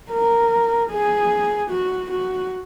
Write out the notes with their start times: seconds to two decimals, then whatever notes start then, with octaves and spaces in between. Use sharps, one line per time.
0.11 A#4
0.90 G#4
1.70 F#4
2.11 F#4